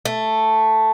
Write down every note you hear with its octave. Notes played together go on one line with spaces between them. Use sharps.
A3